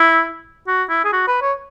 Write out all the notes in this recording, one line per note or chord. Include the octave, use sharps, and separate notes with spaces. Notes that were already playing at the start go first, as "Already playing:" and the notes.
Already playing: E4
F#4
E4
G#4
F#4
B4
C#5